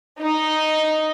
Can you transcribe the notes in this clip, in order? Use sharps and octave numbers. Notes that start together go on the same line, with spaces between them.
D#4